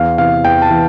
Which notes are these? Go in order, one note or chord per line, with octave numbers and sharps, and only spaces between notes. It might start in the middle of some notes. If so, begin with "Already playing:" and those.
Already playing: E2 F5
C3 E3 F5
E2 G5
A5
E3